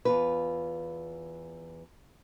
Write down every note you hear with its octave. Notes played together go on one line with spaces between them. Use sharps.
E2 F4 B4